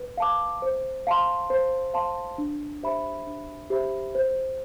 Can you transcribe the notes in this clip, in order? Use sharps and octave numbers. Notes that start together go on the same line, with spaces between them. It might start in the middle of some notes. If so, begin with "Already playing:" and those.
Already playing: B4
F5 A5 D6
C5
F5 A5 C6
C5
F5 A5 C6
D4
G4 C5 E5 B5
D4
G4 C5 E5 B5
C5